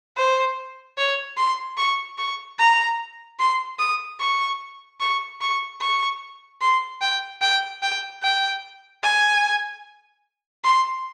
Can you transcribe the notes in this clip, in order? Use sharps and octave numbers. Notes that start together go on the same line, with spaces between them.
C5
C#5
C6
C#6
C#6
A#5
C6
D#6
C#6
C#6
C#6
C#6
C6
G5
G5
G5
G5
G#5
C6